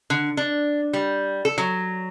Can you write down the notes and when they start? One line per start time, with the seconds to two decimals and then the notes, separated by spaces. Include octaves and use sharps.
0.10 D3
0.37 D4
0.93 G3
1.45 A4
1.58 F#3